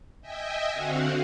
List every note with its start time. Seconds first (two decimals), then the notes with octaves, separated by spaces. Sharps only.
0.21 D#5 E5 G5 G#5
0.72 D3 C4 F#4 F5 F#5